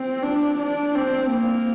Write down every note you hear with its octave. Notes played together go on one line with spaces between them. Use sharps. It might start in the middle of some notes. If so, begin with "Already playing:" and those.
Already playing: C4
D4
D4
C4
A#3